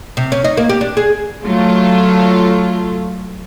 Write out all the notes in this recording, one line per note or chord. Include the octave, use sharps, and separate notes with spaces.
C3
C#4
D#4
A#3
G4
D4
G#4
F#3 A3 F4